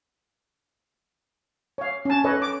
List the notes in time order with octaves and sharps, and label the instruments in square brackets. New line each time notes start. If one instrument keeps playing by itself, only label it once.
[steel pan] C#5 F5
C#4 A5
A4 B4 C#5 D#5
D6